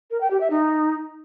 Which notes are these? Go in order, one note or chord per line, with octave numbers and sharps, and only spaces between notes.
A#4
G5
G4
E5
D#4